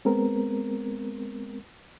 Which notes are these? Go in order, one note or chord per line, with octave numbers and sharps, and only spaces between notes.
G#3 B3 C4 A#4